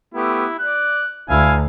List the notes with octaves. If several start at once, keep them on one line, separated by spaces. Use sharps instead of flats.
A3 B3 E4 G4
D5 F#6
D2 E4 F5 G#5